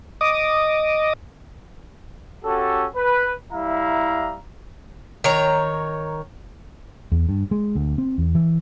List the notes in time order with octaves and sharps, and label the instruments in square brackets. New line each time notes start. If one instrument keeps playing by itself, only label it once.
[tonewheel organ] D#5 D6 D#6
[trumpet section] C#4 F#4 G4 A4
B4
G3 E4 E5 F5 A#5
[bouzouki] D#3 C#5 A#5
[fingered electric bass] E2
G2
G#3
D2
C4
E2
E3